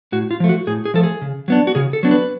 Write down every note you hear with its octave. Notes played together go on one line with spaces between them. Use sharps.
A2 F#4
F4
F3 A3
F#4
A2 G#4
G#4
F3 A3 A4
G#4
C#3
F#3 B3 D4
F#4
C#3 G#4
A4
F#3 B3 D4
B4